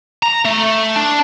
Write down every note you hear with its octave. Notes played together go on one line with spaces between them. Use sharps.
A#5
A3
D4